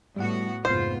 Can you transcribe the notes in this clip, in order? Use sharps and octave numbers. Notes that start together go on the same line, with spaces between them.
A2 G3 B3 F#4 F#5
F1 G#2 B3 F4 C5 C7